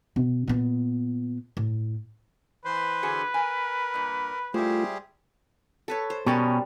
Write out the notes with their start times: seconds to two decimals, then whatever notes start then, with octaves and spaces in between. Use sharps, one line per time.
0.16 B2
0.48 A#2 B3
1.57 A2
2.65 E3 B4 C5 C6
3.03 D3 F#4 G#4
3.34 A#4 G#5
3.94 G2 A#2
4.54 G3 A3 E4 F4 G4 G#4 C5
5.88 A4 B4 C#5
6.10 C5
6.26 B2 G3 C#4 A#4 A5